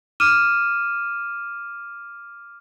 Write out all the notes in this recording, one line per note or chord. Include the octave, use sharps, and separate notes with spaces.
D6 F6 D#7 E7